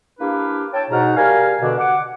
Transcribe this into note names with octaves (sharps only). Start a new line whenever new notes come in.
A#3 D4 E4 G4 B4 F5
C#5 G5 A5
G#2 B2 D#4 F#5 A#5 F6
G3 A#4 F5 G#5
B2 D3 D4
F#5 D6